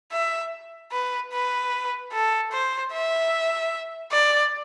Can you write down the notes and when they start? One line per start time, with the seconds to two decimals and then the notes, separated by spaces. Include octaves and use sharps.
0.12 E5
0.92 B4
1.32 B4
2.13 A4
2.52 C5
2.92 E5
4.11 D5